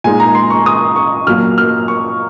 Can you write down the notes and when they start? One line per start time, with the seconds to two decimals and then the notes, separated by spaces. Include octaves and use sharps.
0.04 A#2 G#3 D#4 G#5
0.20 A#5
0.35 C6
0.50 C#6
0.66 D#6
0.96 C#6
1.27 A#2 F#3 A#3 F6
1.58 F6
1.88 C#6